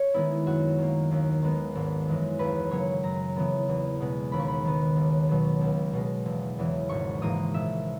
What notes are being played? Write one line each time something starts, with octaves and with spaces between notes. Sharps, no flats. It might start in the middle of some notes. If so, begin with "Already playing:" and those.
Already playing: C#5
D#3 G#3 B3 E4
F#2 F#4
D#3 A#3
D#2
D#3 G#3 B3
G#1
F#2 E3 G#3
D#2 B4
C#3 F#3 A#3 C#5
F#2 A#5
C#3 E3 B3
E2
B2 G#3 B3
D#2 B5
C#6
B5
D#3 G#3 B3
B1
B2 F#3 B3
C#2
B2 G#3
E1
E2 C#3 E3
G#1 C#6
G#2 E3 A#3 D#6
A#1 E5